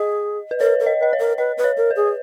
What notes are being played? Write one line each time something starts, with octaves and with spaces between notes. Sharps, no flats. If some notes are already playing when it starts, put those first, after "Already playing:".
Already playing: G#4 D#5
B4
A#4 C#5
A#4
D#5
B4 D#5
C#5
A#4
B4 D#5
B4
C#5
A#4
B4
G#4